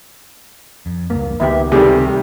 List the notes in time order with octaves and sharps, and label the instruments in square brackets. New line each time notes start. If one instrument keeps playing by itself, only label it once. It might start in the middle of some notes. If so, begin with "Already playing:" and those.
[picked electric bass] F2
[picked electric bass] C#2 G2 [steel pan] A#3
[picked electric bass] C#2 [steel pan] D#3 B3 G4 [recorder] E5
[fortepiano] C3 D#3 G3 [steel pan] A3 G#4 [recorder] G4